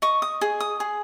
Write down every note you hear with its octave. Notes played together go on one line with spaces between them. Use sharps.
D#5 C#6
D#6
G#4
D#6
G#4